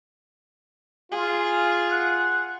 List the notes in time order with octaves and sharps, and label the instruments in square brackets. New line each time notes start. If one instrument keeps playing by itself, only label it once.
[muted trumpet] F4 [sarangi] G#4
[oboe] F#5